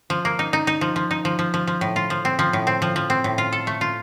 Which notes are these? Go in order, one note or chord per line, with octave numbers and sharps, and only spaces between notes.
F3
A#3
D#4
D#4
D#4
F3
F3
D#4
F3
F3
F3
F3
A2
F4
F3
C4
F3
A2
C4
F3
F3
C4
A2
F4
A4
A3
F4